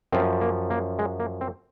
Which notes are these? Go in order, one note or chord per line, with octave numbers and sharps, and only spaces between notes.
F#2 F3 C4
A#3
A#3
G#3
A#3
C4